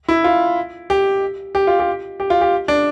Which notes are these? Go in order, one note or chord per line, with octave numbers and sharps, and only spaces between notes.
E4
F4
G4
G4
F4
G4
G4
F4
G4
D4